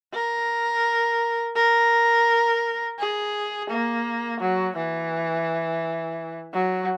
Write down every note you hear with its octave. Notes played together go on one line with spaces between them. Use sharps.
A#4
A#4
G#4
A#3
F#3
E3
F#3